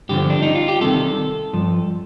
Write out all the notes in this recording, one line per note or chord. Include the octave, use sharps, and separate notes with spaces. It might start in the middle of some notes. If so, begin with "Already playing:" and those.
G2 D3 F3 G4
D4
D#4
F4
G4
C2 C3 D#3 A4
G2 F3